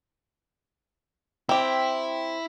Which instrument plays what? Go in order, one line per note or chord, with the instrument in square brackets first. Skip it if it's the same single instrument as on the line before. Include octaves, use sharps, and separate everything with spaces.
[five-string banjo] C4 G4 [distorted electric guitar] E4